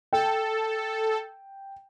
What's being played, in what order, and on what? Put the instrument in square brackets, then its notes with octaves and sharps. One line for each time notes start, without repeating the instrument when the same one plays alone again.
[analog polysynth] A4 [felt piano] G5